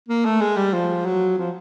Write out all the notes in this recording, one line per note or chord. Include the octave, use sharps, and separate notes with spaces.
A#3
A3
G#3
G3
F3
F#3
F3